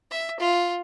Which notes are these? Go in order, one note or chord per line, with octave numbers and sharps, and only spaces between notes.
E5
F4